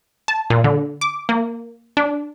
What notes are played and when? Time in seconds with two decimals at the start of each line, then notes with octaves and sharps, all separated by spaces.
0.28 A5
0.50 A#2
0.64 D3
1.01 D6
1.29 A#3
1.97 D4